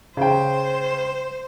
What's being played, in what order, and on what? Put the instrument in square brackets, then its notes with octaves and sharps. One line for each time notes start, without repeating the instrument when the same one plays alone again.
[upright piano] C#3 G5 [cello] C5